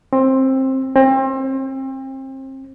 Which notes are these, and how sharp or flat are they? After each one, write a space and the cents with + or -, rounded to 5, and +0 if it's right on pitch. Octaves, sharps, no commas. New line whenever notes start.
C4 +20
C4 +35